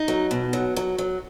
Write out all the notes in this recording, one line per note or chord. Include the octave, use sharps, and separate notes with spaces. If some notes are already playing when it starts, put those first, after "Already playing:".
Already playing: D#4
F#3
B2
F#3
F#3
F#3